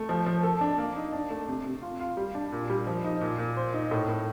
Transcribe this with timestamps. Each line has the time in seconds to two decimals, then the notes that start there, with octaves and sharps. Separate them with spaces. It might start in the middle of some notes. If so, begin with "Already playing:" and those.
Already playing: A3
0.09 F3
0.26 F3
0.43 A4
0.61 D4
0.78 A#3
0.96 D#4
1.13 D4
1.30 A3
1.48 C3
1.65 C3
1.82 F4
2.00 F4
2.17 G3
2.35 D4
2.52 A#2
2.70 G3
2.87 F3
3.04 D#4
3.21 A#2
3.38 A#2
3.57 C5
3.74 D#4
3.91 A2
4.09 A2